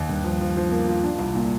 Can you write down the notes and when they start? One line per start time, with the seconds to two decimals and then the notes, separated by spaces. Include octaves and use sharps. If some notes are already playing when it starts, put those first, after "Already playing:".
Already playing: D#2
0.09 G2
0.24 F3
0.41 F3
0.57 F3
0.72 A#3
0.88 F4
1.04 D4
1.19 C2
1.35 A#2